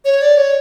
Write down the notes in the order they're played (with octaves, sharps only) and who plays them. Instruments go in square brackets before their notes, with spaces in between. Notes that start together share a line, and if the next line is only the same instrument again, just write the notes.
[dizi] C#5
D5
C#5